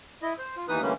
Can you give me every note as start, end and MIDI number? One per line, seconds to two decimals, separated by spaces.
0.22 0.34 64
0.22 0.34 75
0.38 0.56 72
0.56 0.66 65
0.69 0.81 39
0.69 0.81 52
0.69 0.81 59
0.69 0.81 63
0.69 0.81 71
0.69 0.81 87
0.82 0.93 50
0.82 0.93 52
0.82 0.93 55
0.82 0.93 57
0.82 0.93 58
0.82 0.93 61